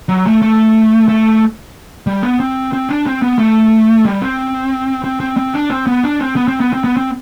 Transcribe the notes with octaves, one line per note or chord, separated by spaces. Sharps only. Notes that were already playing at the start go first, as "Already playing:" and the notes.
F#3
A3
A3
A3
G3
B3
C4
C4
D4
C4
B3
A3
G3
C4
C4
C4
C4
D4
C4
B3
D4
C4
B3
C4
B3
C4
B3
C4